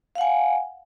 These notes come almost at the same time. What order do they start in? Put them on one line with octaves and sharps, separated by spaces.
F5 F#5 G#5